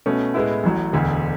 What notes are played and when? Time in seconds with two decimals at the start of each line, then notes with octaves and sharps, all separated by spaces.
0.06 B2 A3 C#4
0.34 A2 G#3 B3 E4
0.63 A1 A2 F#3
0.93 E1 D2 D3